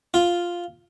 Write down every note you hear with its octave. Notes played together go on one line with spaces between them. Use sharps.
F4